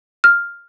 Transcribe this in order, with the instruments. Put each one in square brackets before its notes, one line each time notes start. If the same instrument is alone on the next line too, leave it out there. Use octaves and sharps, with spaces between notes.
[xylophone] F6